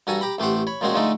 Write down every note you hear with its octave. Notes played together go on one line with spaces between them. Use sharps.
G2 F#4 A4 G#5 A#5
G4 A#5 B5
A1 A3 G4 C5 F#5
C#5 B5
A#2 F3 G#3 C4 C#4 F#4
D3 F3 G#3 A3 D#4 A4